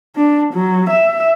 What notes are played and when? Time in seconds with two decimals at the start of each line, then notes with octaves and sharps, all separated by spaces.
0.16 D4
0.54 F#3
0.90 E5